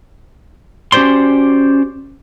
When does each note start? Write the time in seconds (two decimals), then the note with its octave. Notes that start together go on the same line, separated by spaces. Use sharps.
0.92 C#4 F#4 G4 C5 D5 C6